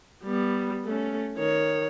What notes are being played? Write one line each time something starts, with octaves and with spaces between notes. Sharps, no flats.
G3 B3
A3 C#4
D#3 C#5